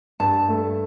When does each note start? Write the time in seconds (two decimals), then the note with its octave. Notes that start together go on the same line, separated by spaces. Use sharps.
0.20 G2 A5
0.49 A3